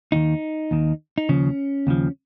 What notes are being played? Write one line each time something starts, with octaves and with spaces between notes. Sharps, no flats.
D#2 D#3 D#4
D#2 D#3
D#4
D#2 C#3 F3 C#4
D#2 C#3 F3